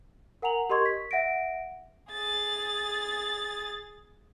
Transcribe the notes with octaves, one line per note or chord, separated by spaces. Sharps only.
A#4 F#5 G#5 A#5 F7 F#7
G4 A#4 D#5 C6 C#6 G#6
B6
E5 F#5 A#6 D7
G#4 A6